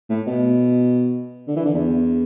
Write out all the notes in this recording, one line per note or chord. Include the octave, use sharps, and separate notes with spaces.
A2
B2
D3
E3
D3
E2